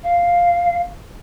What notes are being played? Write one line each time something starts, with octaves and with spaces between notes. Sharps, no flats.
F5